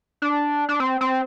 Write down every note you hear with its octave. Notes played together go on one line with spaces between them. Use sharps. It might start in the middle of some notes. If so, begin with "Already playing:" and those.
D4
D4
C4
C4